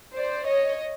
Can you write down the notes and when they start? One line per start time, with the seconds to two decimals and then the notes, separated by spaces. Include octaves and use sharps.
0.16 C5 D5
0.47 C#5 D#5